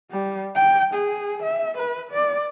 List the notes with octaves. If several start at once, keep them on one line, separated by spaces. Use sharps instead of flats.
G3
G5
G#4
E5
B4
D5